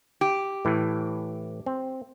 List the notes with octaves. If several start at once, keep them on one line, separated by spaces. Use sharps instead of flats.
G4
A2 E3
C4